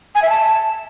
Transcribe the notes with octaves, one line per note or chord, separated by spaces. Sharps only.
G#5
E5
A5